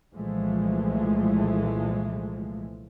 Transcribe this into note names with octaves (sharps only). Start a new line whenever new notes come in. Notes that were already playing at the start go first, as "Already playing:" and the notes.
C2 A#2 E3 F3 G#3 A3